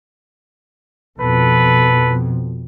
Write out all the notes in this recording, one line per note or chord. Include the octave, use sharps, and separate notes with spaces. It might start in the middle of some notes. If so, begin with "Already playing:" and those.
F2 B2 A4 B4